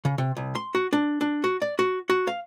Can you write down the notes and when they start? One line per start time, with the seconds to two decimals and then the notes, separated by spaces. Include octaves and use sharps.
0.05 C#3
0.18 C3
0.37 C2
0.55 C6
0.75 F#4
0.93 D4
1.21 D4
1.44 F#4
1.62 D5
1.79 F#4
2.10 F#4
2.27 F5